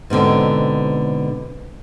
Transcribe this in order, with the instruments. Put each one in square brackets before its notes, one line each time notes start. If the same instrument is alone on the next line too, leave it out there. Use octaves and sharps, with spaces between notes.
[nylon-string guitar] G#2 B2 D3 C4